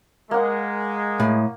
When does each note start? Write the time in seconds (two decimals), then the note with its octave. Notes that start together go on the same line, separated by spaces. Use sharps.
0.31 G#3 A#3 F#5
1.20 A2